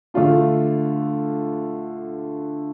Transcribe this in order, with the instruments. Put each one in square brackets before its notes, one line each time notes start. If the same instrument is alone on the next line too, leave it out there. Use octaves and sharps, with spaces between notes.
[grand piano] D3 A3 D4 F4